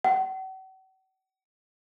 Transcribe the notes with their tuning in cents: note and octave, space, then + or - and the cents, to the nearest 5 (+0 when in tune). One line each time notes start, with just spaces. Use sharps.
F#5 +45